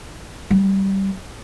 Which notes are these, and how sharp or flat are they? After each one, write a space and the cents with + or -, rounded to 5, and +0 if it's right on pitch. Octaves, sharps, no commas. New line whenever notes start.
G3 -15